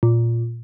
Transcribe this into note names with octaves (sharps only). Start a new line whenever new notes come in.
A#2